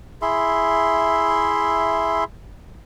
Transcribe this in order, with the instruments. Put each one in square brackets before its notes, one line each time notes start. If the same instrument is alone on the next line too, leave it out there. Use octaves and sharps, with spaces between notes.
[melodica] E4 G#4 E5 C6